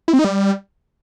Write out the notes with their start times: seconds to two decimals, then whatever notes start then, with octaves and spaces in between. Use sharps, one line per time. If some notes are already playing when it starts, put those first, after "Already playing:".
0.08 E4
0.13 C4
0.19 D#4
0.25 G3